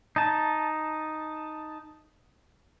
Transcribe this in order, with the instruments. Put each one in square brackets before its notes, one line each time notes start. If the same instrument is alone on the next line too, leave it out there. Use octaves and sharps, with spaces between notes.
[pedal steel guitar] D#4 A5